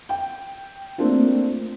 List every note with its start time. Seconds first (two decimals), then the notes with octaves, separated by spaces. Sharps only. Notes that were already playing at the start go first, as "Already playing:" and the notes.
0.09 G5
0.98 A3 A#3 C4 D4 F4